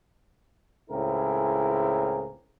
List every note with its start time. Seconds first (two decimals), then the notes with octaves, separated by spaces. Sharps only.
0.90 C#2 A2 C4 E4 G#4 A#4